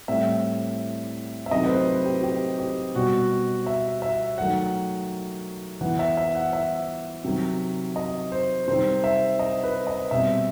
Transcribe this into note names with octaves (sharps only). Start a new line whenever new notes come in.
A2 G3 C4 E5
E5
C3 D#3 F#3 A3 C4 D#5
B4
C5
B4
G4
G4
G4
B2 G3 B3 F#4
E5
E5
D#3 F#3 A3 F#5
E3 B3 F#5
E5
E5
F#5
E5
C3 D#3 F#3
D#5
C5
C3 D#3 G3 C4 C5
E5
D#5
B4
D#5
B2 G3 C4 E5